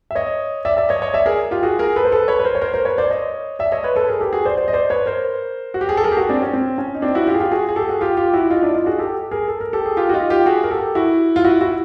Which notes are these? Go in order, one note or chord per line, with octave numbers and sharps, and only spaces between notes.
E5
C#5 D#5
D5 E5
D5 E5
C#5 D#5
C#5 D#5
D5 E5
G#4 A#4
F4 G4
F#4 G#4
G#4 A#4
A4 B4
C5
A4 B4
B4 C#5
B4
A#4 C5
C#5
A#4 C5
A#4 C5
B4 C#5
C5 D5
C#5 D#5
D5 E5
C#5 D#5
B4 C#5
A4 B4
G#4 A#4
G4 A4
F#4 G#4
C5 D5
C5 D5
D#5
C5 D5
B4 C#5
A#4 C5
F#4
G4
G#4
A4
G#4 A#4
G4
F#4 G#4
C4 D4
C#4
C4
C#4
D#4
C4 D4
E4 F#4
F4 G4
G#4
F4 G4
F#4 G#4
G#4
G4 A4
F#4 G#4
F4 G4
F4 G4
E4 F#4
D#4 F4
D4 E4
D#4 F4
F#4 G#4
G4 A4
G#4 A#4
A4
A#4
G4 A4
G#4
F4 G4
F#4
D#4 F4
F4 G4
F#4 G#4
A#4
G4 A4
E4 F#4
F4
E4 F#4
E4 F#4